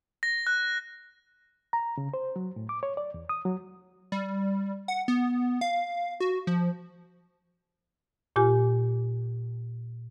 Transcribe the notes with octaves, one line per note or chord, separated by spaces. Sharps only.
A#6
F#6
A#5
C#3
C5
F#3
A2
D6
C#5
D5
E2
D#6
F#3
G3
F#5
B3
F5
F#4
F3
A#2 F4 G4 G#5